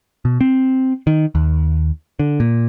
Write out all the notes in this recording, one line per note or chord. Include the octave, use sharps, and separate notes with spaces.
B2
C4
D#3
D#2
D3
A#2